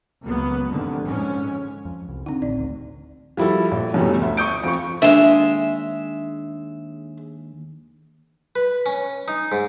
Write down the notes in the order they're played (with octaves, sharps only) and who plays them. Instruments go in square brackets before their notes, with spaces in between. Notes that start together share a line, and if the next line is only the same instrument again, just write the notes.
[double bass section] C#2 F#3 A#3 B3
F1 F2 D3 D#3
F2 G#2 G#3 C#4
[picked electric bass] F2
C2
[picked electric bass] D3 [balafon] C4 D#4
[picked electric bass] A1 [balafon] D5
[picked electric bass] D1 D2
[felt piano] F3 G3 E4 F#4 A4
A#1
F#2 B2 E3 F#3 G3 A3
D2 E5
C#6 D#6 G6 D7
F2 F3 C#6
[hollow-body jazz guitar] D#2 D4 G5 [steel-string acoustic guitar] G#3 E5
[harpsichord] B4
C#4
D#4
G#2